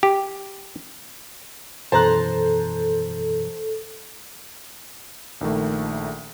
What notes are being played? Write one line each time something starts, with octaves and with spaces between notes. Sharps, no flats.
G4
F#2 B2 E3 A4 C5 A5 A#5 F#6
A#1 D#3 A3